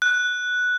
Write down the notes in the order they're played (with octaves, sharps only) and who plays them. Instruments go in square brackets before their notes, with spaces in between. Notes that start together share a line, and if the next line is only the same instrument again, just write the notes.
[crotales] F#6